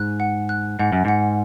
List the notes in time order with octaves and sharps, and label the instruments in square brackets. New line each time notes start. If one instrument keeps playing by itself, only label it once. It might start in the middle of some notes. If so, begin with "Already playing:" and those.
Already playing: [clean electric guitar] G#2 [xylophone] F#6
[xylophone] F#5
F#6
[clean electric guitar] G#2 [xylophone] F#5
[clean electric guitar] F#2
[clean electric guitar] G#2 [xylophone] F#5